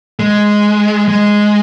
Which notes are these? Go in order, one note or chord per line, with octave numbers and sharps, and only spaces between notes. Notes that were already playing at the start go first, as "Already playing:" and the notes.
G#3
G#3